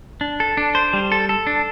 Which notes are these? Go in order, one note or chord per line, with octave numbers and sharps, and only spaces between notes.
D4
A4
D4
C5
G3
A4
A4
D4